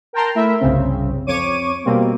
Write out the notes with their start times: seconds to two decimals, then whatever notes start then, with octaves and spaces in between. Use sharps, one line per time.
0.13 A#4 G5 A5 A#5 C6
0.35 A3 E4 A#4 E5
0.60 G1 C2 C#3 C4
1.27 F2 C#5 C#6 D6 D#7
1.85 B2 G3 A#3 C4